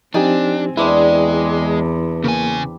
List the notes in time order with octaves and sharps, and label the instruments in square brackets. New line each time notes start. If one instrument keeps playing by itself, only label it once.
[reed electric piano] F3 D#4 G4 [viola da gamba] C4 [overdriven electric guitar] D4 [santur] G#5
[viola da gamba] E2 [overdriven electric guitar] G#3 [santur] C4 D4 B4 [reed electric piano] E4
[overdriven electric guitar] C#3 G#5 [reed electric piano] A#3